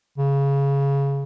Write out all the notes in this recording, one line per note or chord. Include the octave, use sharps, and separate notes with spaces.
C#3